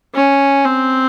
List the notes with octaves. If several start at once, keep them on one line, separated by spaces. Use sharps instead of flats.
C#4
C4